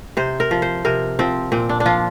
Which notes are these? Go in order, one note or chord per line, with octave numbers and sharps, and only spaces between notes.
C3 C5
A#4
F3
C5
C3 A#4
F3 C4
A#2 C4
D4
D4
F3 F4